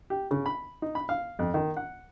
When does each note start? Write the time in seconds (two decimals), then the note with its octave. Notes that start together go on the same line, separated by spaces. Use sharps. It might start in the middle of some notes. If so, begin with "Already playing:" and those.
0.10 G4
0.31 C#3
0.46 B5
0.82 D#4
0.95 B5
1.09 F5
1.39 F2
1.54 D#3
1.77 F#5